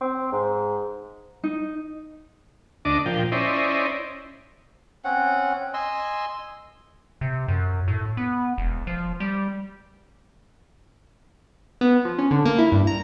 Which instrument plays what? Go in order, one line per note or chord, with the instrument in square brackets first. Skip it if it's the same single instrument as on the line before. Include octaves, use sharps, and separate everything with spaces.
[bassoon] C4
G#2
[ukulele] D#4
[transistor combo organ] D2 D4 D#5 D6
A#2 F3 G5
C#4 E4 C5 D5 D#5
[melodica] C4 C#4 F#5
D#5 G#5 C6 E6
[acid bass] C3
F#2
A2
B3
E1
F3
G3
[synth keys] B3
F3
C#4
D3
A#3
E4
G2
A#5